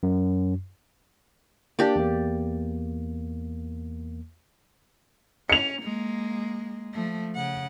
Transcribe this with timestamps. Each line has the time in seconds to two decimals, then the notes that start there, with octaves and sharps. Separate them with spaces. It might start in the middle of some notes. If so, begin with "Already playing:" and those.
0.03 F#2
1.79 A#3 D4 G4 D5
1.96 E2 A#3
5.50 C#4 C#7 F7
5.82 G#3 A#3
6.93 F3 A3
7.35 C#3 F#5